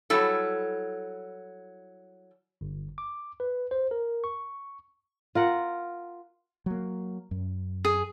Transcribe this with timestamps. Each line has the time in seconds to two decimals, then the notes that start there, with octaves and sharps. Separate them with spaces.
0.10 F#3 G3 E4 A4
2.61 G1
2.98 D6
3.40 B4
3.71 C5
3.91 A#4
4.24 C#6
5.35 F4 A#4 F#5
6.66 F#3 A#3
7.31 F#2
7.85 G#4